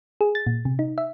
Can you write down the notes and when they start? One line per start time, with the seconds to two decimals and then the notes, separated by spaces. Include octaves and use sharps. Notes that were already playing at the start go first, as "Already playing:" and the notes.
0.21 G#4
0.35 A6
0.47 A#2
0.65 C3
0.79 D#4
0.98 E5